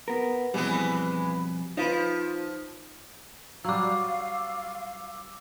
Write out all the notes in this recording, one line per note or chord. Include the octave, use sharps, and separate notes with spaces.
B3 A#4
F2 B2 E3 G3 G#3 B3
F3 D#4 F4 B4
F#3 G3 F5 D6 E6